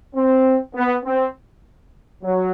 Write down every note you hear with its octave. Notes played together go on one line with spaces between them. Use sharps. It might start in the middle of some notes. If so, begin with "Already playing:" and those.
C4
B3
C4
F#3